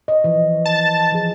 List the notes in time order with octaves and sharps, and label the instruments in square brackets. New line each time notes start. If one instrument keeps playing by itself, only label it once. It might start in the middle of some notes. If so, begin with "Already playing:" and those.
[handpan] C#5 D#5
E3 F3
[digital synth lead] A5
[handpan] F3 G#4